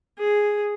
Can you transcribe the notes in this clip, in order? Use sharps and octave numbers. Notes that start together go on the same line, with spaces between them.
G#4